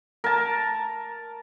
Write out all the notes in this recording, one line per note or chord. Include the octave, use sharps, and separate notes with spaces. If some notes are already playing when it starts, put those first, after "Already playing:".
A#4 A5